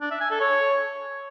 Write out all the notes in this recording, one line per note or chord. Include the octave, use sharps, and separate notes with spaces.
D4
E5
G#5
A4
C#5